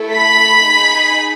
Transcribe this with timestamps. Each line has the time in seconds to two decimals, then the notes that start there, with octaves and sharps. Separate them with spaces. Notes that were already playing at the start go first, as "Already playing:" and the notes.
Already playing: A3 E4 A4
0.13 B5 B6
0.62 D#4 G#4